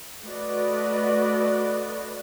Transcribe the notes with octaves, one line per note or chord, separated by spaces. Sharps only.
A3 F#4 B4 D5 D#5